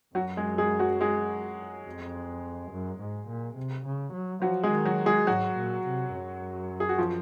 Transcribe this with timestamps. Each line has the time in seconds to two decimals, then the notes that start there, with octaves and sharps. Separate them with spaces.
0.15 F#2 F#3 F#4
0.37 G#3 G#4
0.58 G#3 G#4
0.79 F#3 F#4
1.01 G#3 G#4
1.86 F2
2.71 F#2
3.00 G#2
3.28 A#2
3.56 C3
3.85 C#3
4.13 F#3
4.42 F3 F#3 F#4
4.63 G#3 G#4
4.71 D#3
4.86 F#3 F#4
5.06 G#3 G#4
5.27 G#2 F#3 F#4
5.57 A#2
5.85 C3
6.13 F#2
6.80 G#4
6.89 F#4
6.98 F3 F4